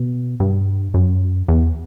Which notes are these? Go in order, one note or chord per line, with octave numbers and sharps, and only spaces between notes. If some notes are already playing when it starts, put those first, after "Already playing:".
Already playing: B2
G2
F#2
E2